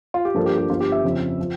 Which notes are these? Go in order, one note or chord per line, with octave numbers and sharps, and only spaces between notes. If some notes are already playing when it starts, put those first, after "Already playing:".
F4
G4
G2 F3 A#3 D4 A4
G4
G4
G1 G2 F3 F4
G4
E5
F2 C#3 F3
F3